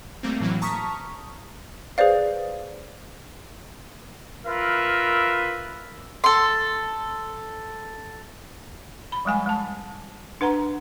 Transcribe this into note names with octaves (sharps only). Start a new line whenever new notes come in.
G3 A3 A#3 C4
A2 E3 F#3 A#3
A5 A#5 C#6 D#6 F6 B6
G#4 B4 C5 D5 F5
F4 A#4 B4 E5
A4 C6
B5
F3 G3 G#3 G#5 B5
G#3 A5
D4 B4 F#5 A#5